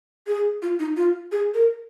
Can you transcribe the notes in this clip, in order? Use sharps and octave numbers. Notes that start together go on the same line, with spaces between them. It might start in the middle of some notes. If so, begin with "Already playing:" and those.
G#4
F4
D#4
F4
G#4
A#4